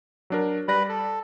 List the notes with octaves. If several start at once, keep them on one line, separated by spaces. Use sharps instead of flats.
F#3 D4 A#4
G3 B4 D5 B5 A#6
A4